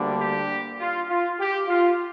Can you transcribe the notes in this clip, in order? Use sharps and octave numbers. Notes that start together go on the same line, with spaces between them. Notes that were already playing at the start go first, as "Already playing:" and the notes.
Already playing: D2 D3 G3 A#3
G4
F4
F4
G4
F4